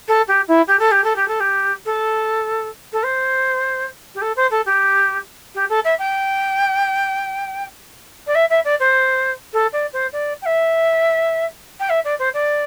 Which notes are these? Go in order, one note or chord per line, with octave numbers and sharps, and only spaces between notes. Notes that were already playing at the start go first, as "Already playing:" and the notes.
A4
G4
E4
G4
A4
G4
A4
G4
A4
G4
A4
A4
C5
G4
A4
C5
A4
G4
G4
A4
E5
G5
D5
E5
E5
D5
C5
A4
D5
C5
D5
G5
E5
G5
E5
D5
C5
D5